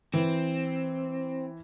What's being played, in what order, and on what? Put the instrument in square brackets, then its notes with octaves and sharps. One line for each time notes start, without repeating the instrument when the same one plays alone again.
[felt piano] E3 [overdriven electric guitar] C4